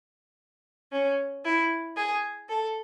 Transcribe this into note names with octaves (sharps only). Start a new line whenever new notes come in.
C#4
E4
G#4
A4